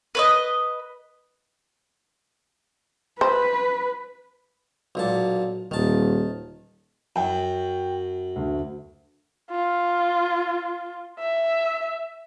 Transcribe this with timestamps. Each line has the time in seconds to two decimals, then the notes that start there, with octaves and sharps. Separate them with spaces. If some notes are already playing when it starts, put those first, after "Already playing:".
0.15 B4 C#5 D#5
3.21 B4 C5
4.95 B1 A#2 A5
5.71 D#1 D#3 A5
7.16 F#2 G5
8.36 D2
9.51 F4
11.19 E5